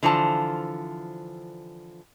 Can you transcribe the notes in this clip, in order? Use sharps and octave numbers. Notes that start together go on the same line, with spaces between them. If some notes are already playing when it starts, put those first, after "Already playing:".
D3 E3 F3 F4 C5 A5